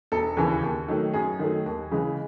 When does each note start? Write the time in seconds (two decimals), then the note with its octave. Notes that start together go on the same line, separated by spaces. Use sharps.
0.12 E1 A4
0.37 D#2 C#3 E3
0.63 D#2
0.88 D#3 F#3 A3
1.13 F#2 G#4
1.39 D#3 F#3 A3
1.66 D#2
1.91 C#3 E3 G#3